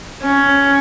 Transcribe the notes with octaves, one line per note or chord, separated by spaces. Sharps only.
C#4